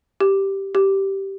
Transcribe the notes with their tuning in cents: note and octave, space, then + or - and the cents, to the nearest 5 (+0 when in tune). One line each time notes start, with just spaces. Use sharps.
G4 -5
G4 -10